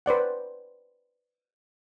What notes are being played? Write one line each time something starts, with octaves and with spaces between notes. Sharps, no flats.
B4 C5 D5 F#5